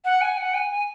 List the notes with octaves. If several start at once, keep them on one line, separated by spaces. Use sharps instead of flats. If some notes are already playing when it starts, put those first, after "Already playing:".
F#5
G#5
F#5
G#5
G#5